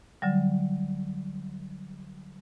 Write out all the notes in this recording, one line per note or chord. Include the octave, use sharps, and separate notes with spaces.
D3 F#3 G3